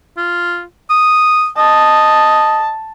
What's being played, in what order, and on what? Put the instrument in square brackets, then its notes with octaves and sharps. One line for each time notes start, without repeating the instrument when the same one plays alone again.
[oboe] F4
D#6
[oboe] D#5 [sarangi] A5